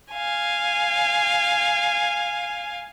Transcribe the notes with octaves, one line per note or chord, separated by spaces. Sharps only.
F5 G#5